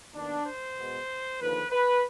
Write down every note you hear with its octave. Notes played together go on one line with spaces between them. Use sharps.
D#2 D#3 B3 D4
C5
B2 G#3 B3
D#2 D3 F3 B4
B4